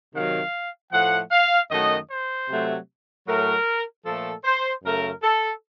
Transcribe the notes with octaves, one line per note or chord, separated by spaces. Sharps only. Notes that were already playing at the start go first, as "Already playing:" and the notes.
C3 D#3 F#3 F5
A2 F3 A3 F#5
F5
F#2 D#3 F#3 A3 D#5
C5
C3 F#3 A3
A2 F#3 A3 A#4
A#2 F3 A3 A4
C5
F#2 C#3 A3 A#4
A4